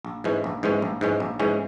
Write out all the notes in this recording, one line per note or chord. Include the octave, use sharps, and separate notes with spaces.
A#1
G#2 E3 G#3 C#4
A#1
G#2 E3 G#3 C#4
A#1
G#2 E3 G#3 C#4
A#1
G#2 E3 G#3 C#4